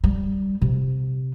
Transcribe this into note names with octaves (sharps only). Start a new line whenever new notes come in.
G3
C3